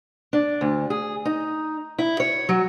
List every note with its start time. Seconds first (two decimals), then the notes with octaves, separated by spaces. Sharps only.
0.33 D4
0.61 D2
0.90 G#4
1.25 D#4
1.99 E4
2.20 C#5
2.49 F#3